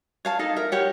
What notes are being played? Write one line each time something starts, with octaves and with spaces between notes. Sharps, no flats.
C#5 F5 A5
D#4 A4 F5
A#4 E5
G4 C#5 F#5